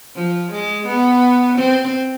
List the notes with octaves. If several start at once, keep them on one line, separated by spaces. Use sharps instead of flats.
F3
G#3
B3
C4